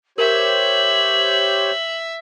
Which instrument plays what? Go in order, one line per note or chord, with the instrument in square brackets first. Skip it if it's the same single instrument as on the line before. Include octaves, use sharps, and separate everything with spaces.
[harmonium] G4 C5 C#5 [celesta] A#4 [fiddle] E5 [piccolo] F#7